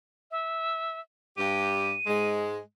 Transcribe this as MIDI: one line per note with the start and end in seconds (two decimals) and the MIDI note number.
0.31 1.00 76
1.37 1.93 43
1.37 1.93 67
1.37 2.28 99
2.06 2.58 44
2.06 2.58 56